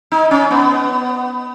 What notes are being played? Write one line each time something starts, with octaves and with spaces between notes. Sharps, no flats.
D#4
C#4
B3